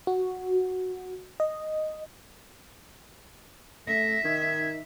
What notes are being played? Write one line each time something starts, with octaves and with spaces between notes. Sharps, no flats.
F#4
D#5
A3 E5 A#6
D#3 D#4 G#6